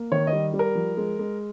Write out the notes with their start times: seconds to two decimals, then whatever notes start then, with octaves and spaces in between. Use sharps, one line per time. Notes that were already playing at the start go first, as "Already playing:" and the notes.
Already playing: A#3
0.12 D#3 C#5
0.27 D#5
0.33 G3
0.54 G3
0.59 A#4
0.75 F3
0.97 G#3
1.19 G#3